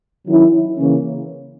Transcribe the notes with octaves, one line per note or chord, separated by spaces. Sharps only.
D#3 F#3 C#4 E4
C#3 E3 A#3 C#4